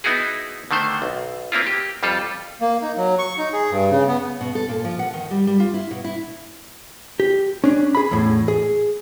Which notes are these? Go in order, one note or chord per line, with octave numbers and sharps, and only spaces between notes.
B3 D#4 E4 F#4 G#4
D3 D#3 A3 C5
B1
A#3 C4 E4 F4
G4
F2 G3 F4 A4
A#3
D#4
F#3
C#6
D#4
G#4
G2
C#3
B3
B2
A4
A#2
F3
F#5
D#3
G3
G3
F4
E4
B2
E4
G4
C#4 D4
G#4 B5
E2 A2
G#4